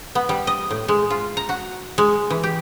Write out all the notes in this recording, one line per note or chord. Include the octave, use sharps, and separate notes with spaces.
B3
G3
D#5
A2
G#3
F4
A#5
F#4
G#3
E3
G4